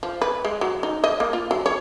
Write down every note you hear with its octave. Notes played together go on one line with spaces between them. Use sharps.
F3
B4
G#3
F#3
D#4
D#5
A#3
F4
F#3
C#5